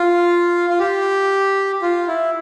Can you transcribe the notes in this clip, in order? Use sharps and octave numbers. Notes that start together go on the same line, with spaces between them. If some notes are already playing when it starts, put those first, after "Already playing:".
Already playing: F4
F4
G4
F4
E4